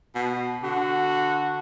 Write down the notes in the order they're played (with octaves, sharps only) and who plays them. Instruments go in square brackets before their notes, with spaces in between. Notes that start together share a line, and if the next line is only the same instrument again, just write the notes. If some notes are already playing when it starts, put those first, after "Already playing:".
[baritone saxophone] B2
[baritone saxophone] D3 [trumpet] F#4